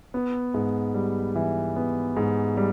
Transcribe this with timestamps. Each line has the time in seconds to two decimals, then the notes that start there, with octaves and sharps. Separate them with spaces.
0.14 B3
0.54 G#2
0.94 G3
1.36 E3
1.76 B3
2.17 G#2
2.57 G3